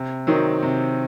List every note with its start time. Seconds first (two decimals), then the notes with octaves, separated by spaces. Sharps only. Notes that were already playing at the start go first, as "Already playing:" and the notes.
Already playing: C3
0.27 D#3 F#3 C4 D#4
0.62 C3